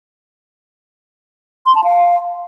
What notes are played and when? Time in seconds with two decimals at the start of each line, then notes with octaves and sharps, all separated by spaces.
1.66 C6
1.75 A5
1.84 F5